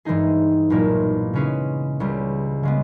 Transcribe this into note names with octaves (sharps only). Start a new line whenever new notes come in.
G2 E3 G#3 D#4 G#4
B1 A#2 A#3 E4
C#3 G#3 C#4 G#4 B4
C#2 C#3 G3
C#3 G#3 B3